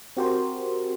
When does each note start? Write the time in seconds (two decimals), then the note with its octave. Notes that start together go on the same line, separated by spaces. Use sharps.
0.17 C4 F#4 G4 A#4 C5